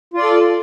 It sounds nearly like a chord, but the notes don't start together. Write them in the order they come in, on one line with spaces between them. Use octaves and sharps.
F4 D5 A4